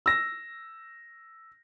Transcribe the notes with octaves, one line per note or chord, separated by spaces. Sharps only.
E6 A#6